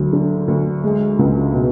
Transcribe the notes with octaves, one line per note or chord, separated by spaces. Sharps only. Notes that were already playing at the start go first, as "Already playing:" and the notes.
Already playing: D2 F#3
D3
D2
G#3
C#2
B2